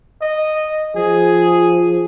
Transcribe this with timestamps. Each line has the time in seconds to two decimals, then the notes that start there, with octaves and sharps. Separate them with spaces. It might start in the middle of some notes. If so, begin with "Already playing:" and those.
0.21 D#5
0.96 F3 G#4